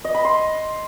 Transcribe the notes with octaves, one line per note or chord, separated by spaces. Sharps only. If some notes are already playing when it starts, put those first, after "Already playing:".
D#5
B5
C6